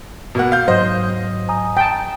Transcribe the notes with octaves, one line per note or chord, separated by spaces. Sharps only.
B2 A#3 F#5
F5 G6
G#2 F#3 C5 D#5
G#5 A#5 D#6
G5 A5